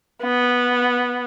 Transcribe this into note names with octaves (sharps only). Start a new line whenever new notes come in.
B3